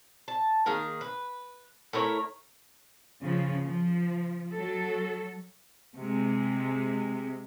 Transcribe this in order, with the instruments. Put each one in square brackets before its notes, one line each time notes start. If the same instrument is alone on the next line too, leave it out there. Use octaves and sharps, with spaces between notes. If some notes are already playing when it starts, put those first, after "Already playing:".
[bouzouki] A5
D#3 A#3 G#4
B4
A3 E4 A#4 C#5
[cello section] C#3 F3
F3
F#3 A4
[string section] C3 G#3